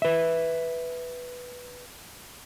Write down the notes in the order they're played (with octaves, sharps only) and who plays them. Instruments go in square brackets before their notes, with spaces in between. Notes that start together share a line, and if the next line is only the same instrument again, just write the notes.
[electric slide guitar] B4 E5